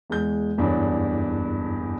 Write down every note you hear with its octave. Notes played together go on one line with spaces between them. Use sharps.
E2 G#3 G6
F#1 E2 G2 D4 C#5